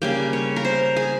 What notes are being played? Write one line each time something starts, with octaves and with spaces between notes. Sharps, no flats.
C#3 G3 A#3 G5
C#5
A#4
C5
G#4